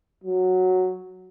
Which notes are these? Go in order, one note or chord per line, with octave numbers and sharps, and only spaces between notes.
F#3